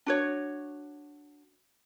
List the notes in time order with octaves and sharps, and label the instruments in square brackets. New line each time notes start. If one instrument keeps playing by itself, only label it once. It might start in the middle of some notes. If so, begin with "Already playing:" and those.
[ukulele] D4 F#4 C#5